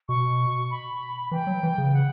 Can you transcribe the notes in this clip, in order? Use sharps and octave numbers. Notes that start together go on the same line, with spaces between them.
B2 C#6
B5
E3 G5
F#3
E3
C#3
F#5